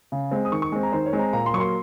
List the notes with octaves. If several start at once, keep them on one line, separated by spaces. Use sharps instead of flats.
C#3
G#3 C4
D#6
D#3 C#6
C#6
G#3 C4
A#5
D#3 C5
C#5
G#3 C4
A#5
A#2 A#5
C6
F#3 A#3 C6 C#6